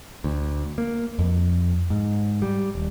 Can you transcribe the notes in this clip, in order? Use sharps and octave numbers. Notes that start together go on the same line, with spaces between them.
D2
A#3
F2
G#2
G3
D#1